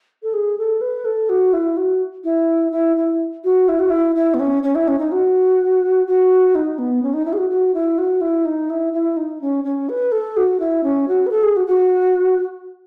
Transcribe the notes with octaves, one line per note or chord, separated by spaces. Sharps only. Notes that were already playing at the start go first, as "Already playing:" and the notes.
A4
G#4
A4
B4
A4
F#4
E4
F#4
E4
E4
E4
F#4
E4
F#4
E4
E4
B3
C#4
C#4
E4
C#4
D#4
F#4
F#4
D#4
B3
C#4
D#4
E4
G#4
F#4
F#4
E4
F#4
E4
D#4
E4
E4
D#4
C#4
C#4
B4
A4
F#4
E4
C#4
F#4
B4
A4
G#4
F#4
F#4